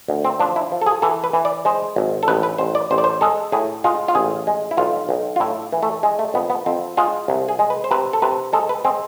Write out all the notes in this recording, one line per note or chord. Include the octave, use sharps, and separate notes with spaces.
D2
C4
F3 D4
E4
F3
A4
G#4
E3 A4
B4
E3
D5
G#3 C5
G#1
A4
A1 B4
B4
A1 C5
D5
A1 C5
D5
C5
G#3 A4
A2 G#4
G#3 F4
F4
A1 G#4
G#3
E4
B1 F4
B1
F4
A2 E4
E3
A3
G#3
A3
F2 B3
B3
F2 C4
G#3 F4
C2
G#4
G#3
B4
C5
C3 B4
A4
C3 B4
G#3 A4
B4
G#3 C4